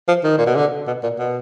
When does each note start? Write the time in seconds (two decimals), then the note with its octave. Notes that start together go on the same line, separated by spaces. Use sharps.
0.08 F3
0.24 D#3
0.38 A#2
0.46 B2
0.55 D3
0.87 B2
1.03 A#2
1.19 B2